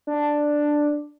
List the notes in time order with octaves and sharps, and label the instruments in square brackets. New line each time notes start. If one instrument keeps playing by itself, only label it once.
[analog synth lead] D4